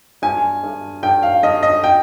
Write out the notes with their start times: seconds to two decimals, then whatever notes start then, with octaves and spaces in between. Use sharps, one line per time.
0.22 G2 G#5
0.63 G2
1.03 G2 G5
1.23 F5
1.43 G2 D#5
1.63 D#5
1.84 G5